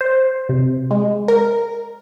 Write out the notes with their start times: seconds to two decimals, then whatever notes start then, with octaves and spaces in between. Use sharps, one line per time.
0.01 C5
0.49 C3
0.91 G#3
1.28 A#4